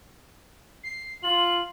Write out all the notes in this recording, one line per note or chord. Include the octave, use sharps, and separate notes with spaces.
C7
F4 F#7